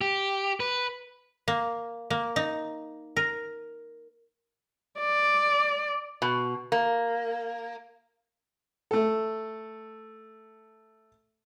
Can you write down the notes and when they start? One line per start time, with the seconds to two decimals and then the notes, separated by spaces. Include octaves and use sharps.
0.01 G4
0.60 B4
1.48 A#3
2.10 A#3
2.36 D#4
3.17 A#4
4.99 D5
6.22 B2
6.72 A#3
8.91 A3 A4